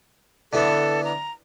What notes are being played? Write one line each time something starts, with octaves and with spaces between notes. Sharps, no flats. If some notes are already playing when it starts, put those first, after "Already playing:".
D3 E3 B3 A4
A#5